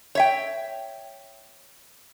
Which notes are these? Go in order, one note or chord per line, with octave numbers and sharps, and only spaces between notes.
C#5 E5 G5